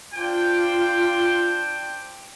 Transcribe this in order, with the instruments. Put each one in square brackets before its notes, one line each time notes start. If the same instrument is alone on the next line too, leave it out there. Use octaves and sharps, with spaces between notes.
[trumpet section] D4 C5 G5 [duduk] F4